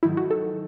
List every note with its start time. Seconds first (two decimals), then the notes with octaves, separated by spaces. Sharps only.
0.03 G#2 D#3 F#3 A3 E4
0.17 F#4
0.31 A4